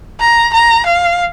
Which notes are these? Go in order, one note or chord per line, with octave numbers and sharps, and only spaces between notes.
A#5
A#5
F5